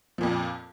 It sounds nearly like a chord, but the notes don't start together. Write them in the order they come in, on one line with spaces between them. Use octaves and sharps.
F3 A#2 F2